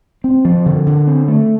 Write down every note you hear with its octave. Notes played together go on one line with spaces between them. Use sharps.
C4
F3
D3
D3
C4
A3